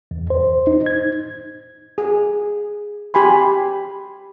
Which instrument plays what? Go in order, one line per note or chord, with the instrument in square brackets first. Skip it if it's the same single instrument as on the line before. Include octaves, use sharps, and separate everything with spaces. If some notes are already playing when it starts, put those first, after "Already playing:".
[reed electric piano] E2
C5
D#4
G#6
[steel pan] G#4
G4 G#5 B5 C6